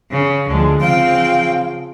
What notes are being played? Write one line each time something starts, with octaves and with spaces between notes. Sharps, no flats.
C#3
D2 D3 F3 G#3
C#3 F3 C4 F5 G5